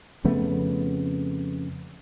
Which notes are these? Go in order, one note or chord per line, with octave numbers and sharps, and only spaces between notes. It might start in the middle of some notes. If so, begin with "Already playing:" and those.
F2 C#3 A3 B3